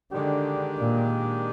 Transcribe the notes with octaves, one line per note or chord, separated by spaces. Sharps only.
D3 D#3 G#3 D4 G4
A#2